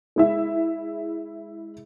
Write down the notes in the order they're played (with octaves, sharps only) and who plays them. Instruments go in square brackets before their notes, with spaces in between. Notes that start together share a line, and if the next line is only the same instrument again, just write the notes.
[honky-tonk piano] G#3 E4 E5